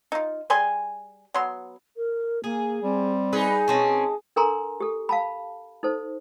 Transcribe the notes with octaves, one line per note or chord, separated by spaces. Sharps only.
D#4 F4
G3 G#4 G#5 C6
F#3 B3 C6
A#4
A#3 G#4
G3 C4
D#4 G#4 B4
B2 C4 C#4 A5
D4 A4 A#4 G#5 A#5 C6
G4 A4
F5 A5 B5
D#4 A4 C5